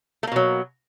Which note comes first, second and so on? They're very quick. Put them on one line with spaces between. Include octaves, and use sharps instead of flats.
A3 A#3 B2 F#3